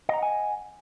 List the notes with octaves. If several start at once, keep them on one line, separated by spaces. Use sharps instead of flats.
D#5 F#5 G#5 A#5